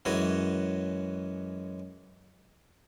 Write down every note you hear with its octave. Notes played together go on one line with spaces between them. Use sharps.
F#2 E3 G#3 F#4 C#5